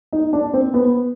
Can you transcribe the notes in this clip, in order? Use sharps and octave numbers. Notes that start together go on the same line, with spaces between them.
D#4
D4
C4
B3